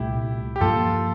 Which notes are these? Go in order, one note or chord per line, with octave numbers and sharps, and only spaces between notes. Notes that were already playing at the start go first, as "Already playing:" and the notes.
Already playing: C2 A#2 A3 E4 G4
G4
G2 F3 A#3 F4 A4